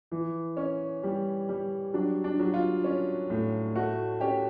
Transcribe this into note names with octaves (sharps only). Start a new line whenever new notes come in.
E3
C#4
G3
G3
F#3 D4
D4
F#3
F4
C#4
A2
A3 F#4
C#4 G4